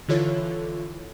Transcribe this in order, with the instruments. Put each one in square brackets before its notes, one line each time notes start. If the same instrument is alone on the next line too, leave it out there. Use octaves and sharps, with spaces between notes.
[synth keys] D3 E3 E4 F4 A4 C#5